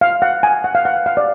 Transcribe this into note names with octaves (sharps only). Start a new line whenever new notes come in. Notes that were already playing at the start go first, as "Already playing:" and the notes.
F5
F#5
G#5
F#5
F5
F#5
F5
D5